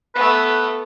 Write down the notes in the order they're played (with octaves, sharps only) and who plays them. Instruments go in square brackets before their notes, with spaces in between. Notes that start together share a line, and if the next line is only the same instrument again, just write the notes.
[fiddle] A3 B3 [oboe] B4